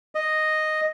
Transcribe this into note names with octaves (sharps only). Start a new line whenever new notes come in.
D#5